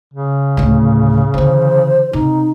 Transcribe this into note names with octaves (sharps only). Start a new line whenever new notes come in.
C#3
D2 A2
D3 E3 C5
C3 D#4